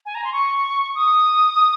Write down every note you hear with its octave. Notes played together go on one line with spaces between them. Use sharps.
G#5
A#5
C6
C#6
D#6